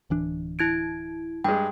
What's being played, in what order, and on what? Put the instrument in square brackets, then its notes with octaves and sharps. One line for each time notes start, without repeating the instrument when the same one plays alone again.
[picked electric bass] D1 E3 D4
[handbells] E4 G#6 D7
[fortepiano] G2 G#3 [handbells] G5